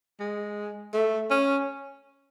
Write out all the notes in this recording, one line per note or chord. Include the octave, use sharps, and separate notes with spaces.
G#3
A3
C#4